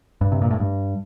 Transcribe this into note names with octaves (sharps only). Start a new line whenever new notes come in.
G2
C3
A#2
A2
G2